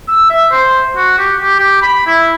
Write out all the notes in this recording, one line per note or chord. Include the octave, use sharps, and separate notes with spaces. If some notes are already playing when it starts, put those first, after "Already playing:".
E6
E5
C5
F#4
G4
G4
G4
B5
E4